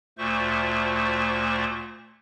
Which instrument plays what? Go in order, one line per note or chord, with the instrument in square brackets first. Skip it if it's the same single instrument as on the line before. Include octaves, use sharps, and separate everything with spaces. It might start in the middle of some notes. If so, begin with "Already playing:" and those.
[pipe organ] D2 A#2 A3 C5 C#6